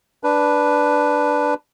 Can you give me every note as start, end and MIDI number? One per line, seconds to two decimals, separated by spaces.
0.24 1.54 62
0.24 1.54 71